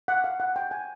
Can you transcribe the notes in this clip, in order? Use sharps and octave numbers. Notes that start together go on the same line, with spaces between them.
F#5
F5
F#5
G5
G#5